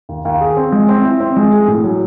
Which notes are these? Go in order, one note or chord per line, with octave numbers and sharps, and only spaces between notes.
D#2
D#2
G#4
C4
G#3
C4
E4
C4
G#3
G#4
A2
F#3